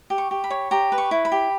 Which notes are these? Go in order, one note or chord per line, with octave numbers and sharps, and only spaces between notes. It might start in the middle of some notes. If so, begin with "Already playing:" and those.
G4
C#6
G4
B5
C#5
G4 A#5
B4
C#6
E4
B5
G4